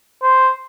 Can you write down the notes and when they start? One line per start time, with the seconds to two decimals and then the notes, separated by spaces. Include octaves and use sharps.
0.23 C5